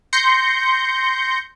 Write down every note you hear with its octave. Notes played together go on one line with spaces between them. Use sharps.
C6 G6 A#6 C#7